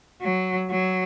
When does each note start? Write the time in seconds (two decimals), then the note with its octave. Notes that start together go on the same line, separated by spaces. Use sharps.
0.22 F#3
0.70 F#3